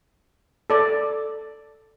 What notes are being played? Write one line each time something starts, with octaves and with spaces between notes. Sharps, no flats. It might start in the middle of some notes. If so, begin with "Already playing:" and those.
A4 D5